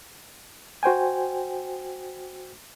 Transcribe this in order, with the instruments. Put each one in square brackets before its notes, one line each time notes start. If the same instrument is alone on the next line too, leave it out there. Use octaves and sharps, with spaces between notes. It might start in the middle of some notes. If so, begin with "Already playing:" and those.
[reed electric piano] F#4 C5 G5 G#5